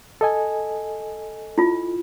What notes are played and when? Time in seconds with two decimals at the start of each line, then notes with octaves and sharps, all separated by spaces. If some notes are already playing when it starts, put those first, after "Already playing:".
0.21 A4 D#5 G#5
1.58 E4 F4